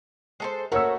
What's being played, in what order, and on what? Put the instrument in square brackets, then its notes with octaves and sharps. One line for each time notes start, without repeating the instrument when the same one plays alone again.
[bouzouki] G#3 A4 C5
[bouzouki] A3 F#4 A4 [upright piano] A#4 C#5 E6